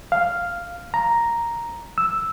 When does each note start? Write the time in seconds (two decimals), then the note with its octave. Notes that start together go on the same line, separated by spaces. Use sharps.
0.12 F5
0.94 A#5
1.98 E6